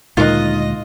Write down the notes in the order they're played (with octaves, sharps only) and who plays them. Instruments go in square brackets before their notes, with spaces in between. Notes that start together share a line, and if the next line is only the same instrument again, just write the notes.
[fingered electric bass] D2 A#2 G#3 [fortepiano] D#3 F#6 [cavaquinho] F4 [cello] D#5